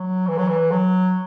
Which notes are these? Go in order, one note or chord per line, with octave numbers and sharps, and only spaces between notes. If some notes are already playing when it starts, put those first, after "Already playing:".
Already playing: F#3
E3
F#3
E3
F#3